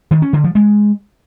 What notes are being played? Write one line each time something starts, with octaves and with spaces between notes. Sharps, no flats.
D#3
C#4
D3
F3
G#3